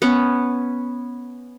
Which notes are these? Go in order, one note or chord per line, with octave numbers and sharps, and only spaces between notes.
B3 C#4